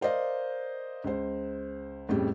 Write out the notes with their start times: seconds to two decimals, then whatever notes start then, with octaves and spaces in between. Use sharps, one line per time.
0.01 A#4 C5 D5 D#5 F5
1.04 C#2 C5
2.09 F2 A2 C#3 G3